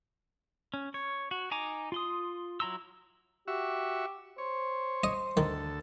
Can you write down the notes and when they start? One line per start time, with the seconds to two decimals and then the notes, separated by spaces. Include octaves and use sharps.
0.74 C#4
0.94 C#5
1.31 F#4
1.51 D#4 G#5 A#5 D6
1.92 F4 C6 D#6
2.60 F#3 E4 A#5 C6 E6
3.48 F#4 G4 E5 C#6
4.38 C5 C#5
5.04 D#5
5.37 D2 D#3 A4